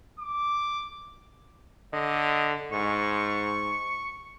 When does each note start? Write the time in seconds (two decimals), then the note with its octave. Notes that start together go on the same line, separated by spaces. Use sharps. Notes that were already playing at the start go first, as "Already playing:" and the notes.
0.20 D6
1.93 D3 D#5
2.72 G#2 C#6